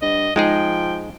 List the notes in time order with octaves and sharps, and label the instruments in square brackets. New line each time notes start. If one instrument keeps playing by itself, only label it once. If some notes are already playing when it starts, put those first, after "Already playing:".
[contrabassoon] G2 [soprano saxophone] D#5
[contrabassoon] F3 [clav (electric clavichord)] G#3 D#4 G#4 [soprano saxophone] G5